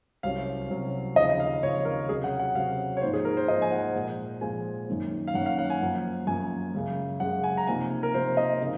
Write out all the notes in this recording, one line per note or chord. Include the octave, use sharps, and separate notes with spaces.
C2 C3 F#3 C#4 F5
C2 C3 F#3 C#4
D#2 C#3 F3 C4 D#5
F5
D#2 C#3 F3 C4 C#5
A#4
C3 F#3 C#4 G#4
F#5
F#5
C3 F#3 C#4 F5
C#5
G#2 F3 A#3 D#4 C5
G#4
A#4
C5
G#2 F3 A#3 D#4 D#5
G#5
F#5
A#2 F3 G#3
A#2 F3 G#3 G#5
F#2 D#3 A#3 C#4
F5
F#2 D#3 A#3 C#4 F#5
F5
F#5
G#5
F#2 F3 A#3
F#2 F3 A#3 G#5
F#2 C#3 G#3
F#2 C#3 G#3 F#5
G#5
A#5
C3 F3 A#3 D#4 G#5
A#4
C3 F3 A#3 D#4 C5
D#5
C#3 F3 C4 D#4